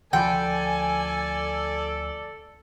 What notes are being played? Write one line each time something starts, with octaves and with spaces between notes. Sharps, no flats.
D2 F3 A4 D5 G5 G#5 B5